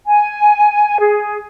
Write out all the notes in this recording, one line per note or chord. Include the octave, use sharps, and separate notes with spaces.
G#5
G#4